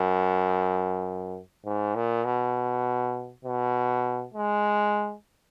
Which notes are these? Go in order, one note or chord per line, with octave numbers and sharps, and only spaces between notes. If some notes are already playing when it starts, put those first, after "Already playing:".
Already playing: F#2
G#2
A#2
B2
B2
G#3